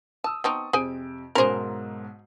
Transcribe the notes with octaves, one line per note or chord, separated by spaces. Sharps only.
A5 D#6 E6
B3 C4 D#4 A5 C#6 D#6
F2 C3 G#4 C5 G#5 D7
B1 G#2 C#4 G#4 A#4 C5